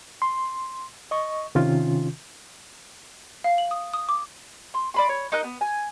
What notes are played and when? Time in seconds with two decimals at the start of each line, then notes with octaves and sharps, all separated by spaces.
0.22 C6
1.11 D#5 C#6
1.55 C3 D#3 C#4 F4
3.44 F5
3.58 F#7
3.71 D#6
3.93 D#6
4.09 D6
4.74 C6
4.94 D5 B5 C6
5.09 C#5
5.32 D#4 A#4 D#5 F#6
5.44 B3
5.61 G#5